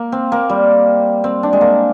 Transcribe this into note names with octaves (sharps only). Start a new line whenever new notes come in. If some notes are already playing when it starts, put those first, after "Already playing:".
Already playing: A#3
C4
A#3
G3
C4
D4
G#3
A#3